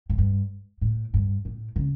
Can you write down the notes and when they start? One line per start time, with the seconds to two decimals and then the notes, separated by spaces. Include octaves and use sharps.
0.10 A2
0.18 G2
0.81 A2
1.14 G2
1.45 A2
1.76 C#3